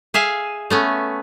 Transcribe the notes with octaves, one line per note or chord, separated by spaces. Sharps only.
G#4 E5 F5 G#5
A3 B3 C#4